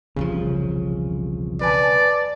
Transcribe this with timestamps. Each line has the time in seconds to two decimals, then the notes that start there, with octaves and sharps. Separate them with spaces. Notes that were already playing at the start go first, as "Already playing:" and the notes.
0.16 E1 C2 C#3 F3
1.61 B4 D5 G#5 A5